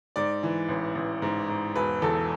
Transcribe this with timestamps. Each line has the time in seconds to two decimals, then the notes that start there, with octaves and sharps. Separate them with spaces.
0.16 G#2 D5
0.43 E3
0.69 A1
0.95 A1
1.22 G#2
1.49 G#2
1.75 E1 B4
2.02 E2 A4